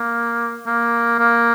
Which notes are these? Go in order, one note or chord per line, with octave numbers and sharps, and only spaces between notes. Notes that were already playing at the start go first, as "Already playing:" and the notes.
Already playing: A#3
A#3
A#3